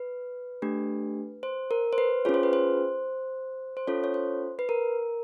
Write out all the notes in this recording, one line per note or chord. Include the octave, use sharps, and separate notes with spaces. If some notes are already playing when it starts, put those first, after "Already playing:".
Already playing: B4
A3 D4 G4
C5
A#4
C5
B4
C#4 F4 G#4 C#5
C5
B4
C5
C5
C#4 F4 A4 C#5
C#5
C5
B4
A#4